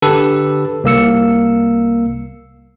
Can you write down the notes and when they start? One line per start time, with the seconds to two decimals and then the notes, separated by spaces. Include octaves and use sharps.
0.02 D3 G4 A4 B4
0.84 C2 A#3 E6 C#7